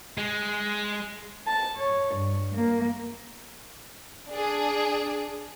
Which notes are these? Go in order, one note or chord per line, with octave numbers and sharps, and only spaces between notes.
G#3
A5
C#5
G2
A#3
D4 G#4